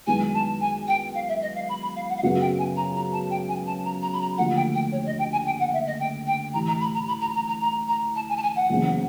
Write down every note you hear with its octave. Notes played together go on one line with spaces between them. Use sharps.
F#2 D#3 G#3 B3 E4 G#5
A5
G#5
G5
F5
E5
D#5
F5
B5
B5
F5
F#5
F5
F#2 C#3 F#3 B3 F#5
G5
G#5
A#5
A#5
A5
G5
G#5
A5
A#5
A#5
B5
A#5
D#2 D3 F3 A3 F#5
G5
G5
C#5
D#5
G5
G#5
G5
F#5
E5
D#5
G5
G5
A1 A2 E3 G3 A#5
A#5
B5
A#5
B5
A#5
A#5
A#5
A#5
A#5
A5
G#5
A5
G#5
F#5
F#1 E2 C#3